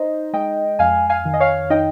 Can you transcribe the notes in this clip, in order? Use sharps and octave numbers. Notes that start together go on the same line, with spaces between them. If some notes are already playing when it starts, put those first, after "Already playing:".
Already playing: D#4 C5 D#5
G#3 D#5 G5
F2 F5 G#5
F5 G#5
D#3
D#5
C#5 F5
D#4 D#5 G5